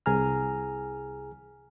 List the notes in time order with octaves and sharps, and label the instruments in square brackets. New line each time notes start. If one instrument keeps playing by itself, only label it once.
[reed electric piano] C2 G#4 G#5 A#5 F6